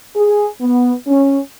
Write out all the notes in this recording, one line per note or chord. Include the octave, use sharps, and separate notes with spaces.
G#4
B3
C#4